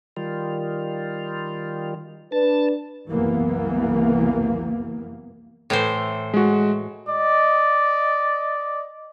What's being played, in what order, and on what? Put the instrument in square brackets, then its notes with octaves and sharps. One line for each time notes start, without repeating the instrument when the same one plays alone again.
[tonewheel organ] D#3 G3 F4
[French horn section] D4 B4 [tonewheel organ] A5
[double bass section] F#1 C2 E3 A#3 B3
[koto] A2 E3 C5
[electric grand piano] G#3 F#4
[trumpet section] D5 D#5